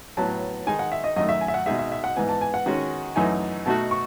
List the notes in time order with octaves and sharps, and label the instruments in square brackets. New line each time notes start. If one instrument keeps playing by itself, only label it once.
[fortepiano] A2 F#3 B3 [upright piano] A5
[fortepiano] D#3 G#3 D#4 G#4 [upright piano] G#5
[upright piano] F#5
E5
D#5
[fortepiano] F#2 D#3 A3 [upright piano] D#5
[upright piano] E5
G#5
E5
F#5
[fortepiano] B2 G#3 D#4 G#4 [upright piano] E5
[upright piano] E5
E5
F#5
[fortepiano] G#2 E3 B3 [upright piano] G#5
[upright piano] A5
G#5
F#5
[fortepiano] D#3 G#3 C#4 F#4
[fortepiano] F#2 E3 A3 D#4 [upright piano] G#5
[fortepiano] B2 A3 D#4 F#4 [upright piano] A5
[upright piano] C#6